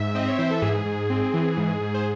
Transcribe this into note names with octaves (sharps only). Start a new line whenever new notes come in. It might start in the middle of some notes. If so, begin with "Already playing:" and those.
Already playing: G#2 E5
C4 D#5
C#5
E3 C5
A4
G#2 G#4
G#2
C4
E3
G#2
G#2
C5